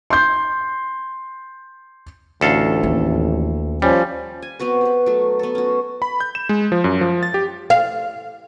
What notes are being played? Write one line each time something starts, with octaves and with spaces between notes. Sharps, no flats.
C6 G6
A1 D2 A4 F5
D#2
F3 G3 C#4
G#5
B3 C4 F#4 B4
G4 B4
F#3 A3
B3 A4
C#4 F#4
B5
G6
E7
G#3
F3
F#2
F3
A6
G4
F5